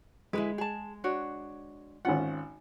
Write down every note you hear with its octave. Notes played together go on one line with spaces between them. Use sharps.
G#3 E4 G#4 B4
G#4 A5
D4 F#4 C#5
G#1 C#4 F4 F#5